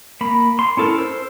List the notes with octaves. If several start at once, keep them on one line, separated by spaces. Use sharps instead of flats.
A#3 B5
C6
C#4 E4 A4 A#4
C5 E6